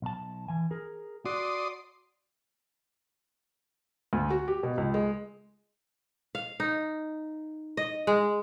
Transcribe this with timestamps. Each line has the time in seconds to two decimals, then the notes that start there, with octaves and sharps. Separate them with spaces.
0.02 B1 A5
0.48 E3 G#5
0.71 G#4 A#4
1.25 F#4 D5 C6 D#6
4.13 D2
4.30 F#4
4.48 G4
4.63 B2
4.78 C#2
4.94 G#3
6.35 F5
6.60 D#4
7.77 D#5
8.07 G#3